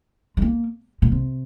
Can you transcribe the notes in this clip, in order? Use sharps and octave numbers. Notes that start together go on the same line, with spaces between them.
G#3
A#3
A#2
C3